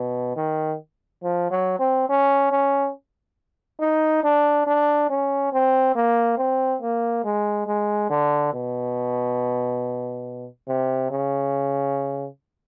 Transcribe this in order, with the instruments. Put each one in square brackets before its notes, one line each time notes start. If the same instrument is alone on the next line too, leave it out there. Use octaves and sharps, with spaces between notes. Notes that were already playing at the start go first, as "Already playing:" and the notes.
Already playing: [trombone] B2
D#3
F3
F#3
C4
C#4
C#4
D#4
D4
D4
C#4
C4
A#3
C4
A#3
G#3
G#3
D3
B2
C3
C#3